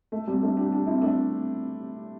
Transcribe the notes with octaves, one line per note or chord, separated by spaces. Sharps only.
A3
G3 C4
A3 D4
D4 G4
D4 G4
C4 E4
A3 D4